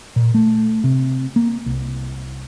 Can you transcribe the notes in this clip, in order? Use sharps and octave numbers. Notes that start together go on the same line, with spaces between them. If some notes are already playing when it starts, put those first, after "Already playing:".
A#2
A3
C3
A#3
C2